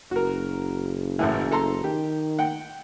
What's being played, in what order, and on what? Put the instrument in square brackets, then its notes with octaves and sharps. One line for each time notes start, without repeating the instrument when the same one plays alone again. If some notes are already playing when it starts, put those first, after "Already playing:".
[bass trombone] F#1 [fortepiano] F#4 A#4
[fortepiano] A1 F#2 E3
A4 A#5 C6
[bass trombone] D#3 [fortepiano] G4
[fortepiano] F#5 G5